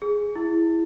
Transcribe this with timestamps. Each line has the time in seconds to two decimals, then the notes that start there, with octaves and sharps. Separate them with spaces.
0.02 G#4
0.36 E4